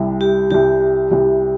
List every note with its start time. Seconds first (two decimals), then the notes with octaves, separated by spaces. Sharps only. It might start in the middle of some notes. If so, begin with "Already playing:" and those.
Already playing: C2 C3 G3 E4
0.21 G4
0.50 C2 C3 G3 E4 G4
1.11 C2 C3 G3 E4